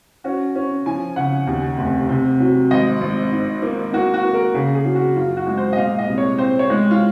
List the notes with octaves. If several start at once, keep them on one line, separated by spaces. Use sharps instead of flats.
C#4 F#4
C#4
F3 G#5
C#3 F#5
D#2
F1
C3
F#3
G#1 D#5
G#1
G#2
A#3
A#3 F#4
F#4
A#3
A#4
C#3 G#4
G#4
F#3
F#4
F#2 F4
F#4
G#3
C5
D#5
A#2 F5
D#5
C2
C#5
C4 C5
C#5
G#3
F4